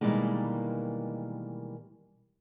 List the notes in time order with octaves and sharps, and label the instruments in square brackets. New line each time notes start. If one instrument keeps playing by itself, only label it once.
[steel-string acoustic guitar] B2 D#3 E3 G3 G#3 A#3